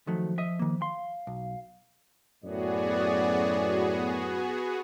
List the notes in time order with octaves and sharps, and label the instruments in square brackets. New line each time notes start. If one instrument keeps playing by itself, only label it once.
[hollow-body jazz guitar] D#3 F#3 A3 [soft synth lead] F3
[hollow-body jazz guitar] D#5 E5
D#3 A#3
[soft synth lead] F5 [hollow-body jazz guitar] C6
[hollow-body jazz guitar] B1
[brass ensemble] F#2 A2 [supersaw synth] B3 F#4 G#4 [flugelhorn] D5